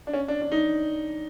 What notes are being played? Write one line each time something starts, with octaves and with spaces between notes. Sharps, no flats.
D4
C#4
D4
D4
D#4